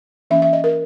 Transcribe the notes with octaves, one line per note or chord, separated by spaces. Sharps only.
E3 A#3 C#4 E5
E5
D#5
A#4